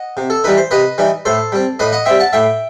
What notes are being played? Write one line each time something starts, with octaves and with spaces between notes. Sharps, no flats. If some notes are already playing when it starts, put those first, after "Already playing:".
Already playing: D#5 F#5
C3
A4
E3 G3 D#4 B4
C5
C3 B4 D#5
E3 G3 D#4
A2 A4 C5
G3 C4
A2 B4 D#5
D#5 F#5
G3 C4 E5 G5
F#5 A5
A2 E5 G5